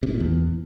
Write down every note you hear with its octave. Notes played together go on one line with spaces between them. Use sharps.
C3
G#2
A#2
E2